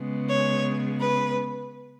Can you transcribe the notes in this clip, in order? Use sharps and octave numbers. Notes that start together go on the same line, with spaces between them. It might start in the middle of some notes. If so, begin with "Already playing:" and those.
Already playing: C#3 G#3 B3
C#5
B4